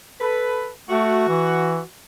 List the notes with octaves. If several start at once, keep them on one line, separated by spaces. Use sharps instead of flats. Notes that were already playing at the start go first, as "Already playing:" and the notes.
A4 B4
A3 F#4
E3